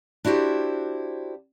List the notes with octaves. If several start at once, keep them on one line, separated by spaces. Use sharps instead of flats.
D4 E4 F#4 G4 C5